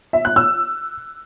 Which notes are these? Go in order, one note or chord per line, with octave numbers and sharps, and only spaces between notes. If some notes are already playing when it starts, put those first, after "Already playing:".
E5
F#6
E6